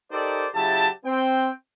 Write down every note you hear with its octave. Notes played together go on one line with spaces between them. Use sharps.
D#4 G4 A4 A#4 C5 D5
C#3 F#3 E4 G4 E5 A5
C4 G5